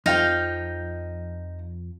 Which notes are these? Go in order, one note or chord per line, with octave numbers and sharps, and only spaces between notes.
F2 F3 D#4 F5 G5